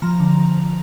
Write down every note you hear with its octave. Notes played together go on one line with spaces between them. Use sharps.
F3 A#5
D3